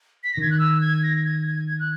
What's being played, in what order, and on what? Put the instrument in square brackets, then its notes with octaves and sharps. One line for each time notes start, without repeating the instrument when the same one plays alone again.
[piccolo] B6
A#6
[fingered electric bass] D#3 [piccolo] G#6
[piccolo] F#6
E6
G#6
A#6
G#6
G#6
G#6
F#6